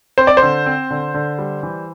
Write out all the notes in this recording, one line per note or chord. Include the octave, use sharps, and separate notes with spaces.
C4 C5
D5
C5
D3
C4
D3
D3
G3
E3